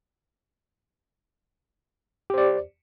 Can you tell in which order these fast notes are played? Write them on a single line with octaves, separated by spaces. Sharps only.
G4 C5 D5